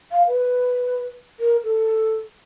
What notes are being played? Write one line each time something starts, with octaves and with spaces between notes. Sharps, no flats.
F5
B4
A#4
A4